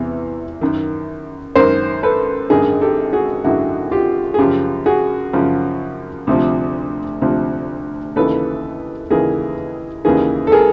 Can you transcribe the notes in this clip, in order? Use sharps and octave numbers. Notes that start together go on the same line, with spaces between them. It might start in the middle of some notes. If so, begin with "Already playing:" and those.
Already playing: E2 C3 E3
F#2 D#3
F#2 D#3 A#4 C5
A4 B4
G#1 F#2 D3 G#4 A#4
G4 A4
F#4 G#4
G#1 F#2 D3 E4 F#4
F4 G4
G#4
F#2 C#3 F3 F4 G4
F#4 G#4
F#2 C#3 F3
D2 C3 F3
D2 C3 F3
D#2 C#3 E3 A4 B4
D#2 C#3 E3 G#4 A#4
D#2 C#3 E3 G#4 A#4
A4
G#4 A#4